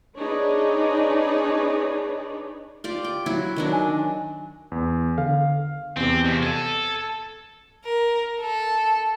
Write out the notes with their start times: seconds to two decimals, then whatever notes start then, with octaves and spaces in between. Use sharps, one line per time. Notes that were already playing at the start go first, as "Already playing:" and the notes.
0.19 D4 D#4 G#4 B4 C#5 D5
2.84 F4 G4 D5
3.04 G5
3.26 F#3 E4 F#4
3.56 D#3 F#3 D4
3.72 G#5
4.72 E2
5.18 D3 F5
5.97 E2 C3 C4
6.25 F2
6.43 A4 G#6 A6 D#7
7.85 A#4
8.40 A4